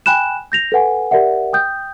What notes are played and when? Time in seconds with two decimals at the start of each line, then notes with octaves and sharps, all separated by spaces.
0.06 G5 G#5 B5 F#6 E7
0.52 G6 A#6 F7
0.72 A4 B4 F#5 G#5
1.11 G4 A#4 D5 E5 F#5
1.53 G5 D#6 G6